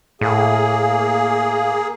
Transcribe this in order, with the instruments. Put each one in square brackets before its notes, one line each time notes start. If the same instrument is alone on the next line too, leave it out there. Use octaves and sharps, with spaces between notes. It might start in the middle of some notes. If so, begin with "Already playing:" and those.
[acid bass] A2 [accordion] A#3 G#4